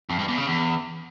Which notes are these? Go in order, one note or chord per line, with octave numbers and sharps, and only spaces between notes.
F2
G2
E2
C#3
E2